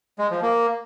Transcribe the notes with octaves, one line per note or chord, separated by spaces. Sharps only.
G#3
F3
A#3